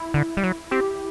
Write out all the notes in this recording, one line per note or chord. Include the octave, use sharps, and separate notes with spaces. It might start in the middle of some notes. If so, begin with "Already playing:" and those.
Already playing: E4
D3
G3
F#3
C4 G4